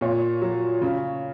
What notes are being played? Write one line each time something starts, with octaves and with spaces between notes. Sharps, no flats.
A#2 C#5
F#3
C#3